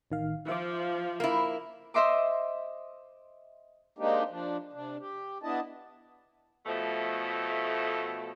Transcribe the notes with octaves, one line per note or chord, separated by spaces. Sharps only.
A1 D#3 F5
F3 E5 D6
A#3 E4
C5 D#5 E5 C6 D6
G#3 A#3 C4 D4 D#4 G4
F3 D4
C3 D4
G4
B3 D4 E4 D#5 A5
B2 F3 A3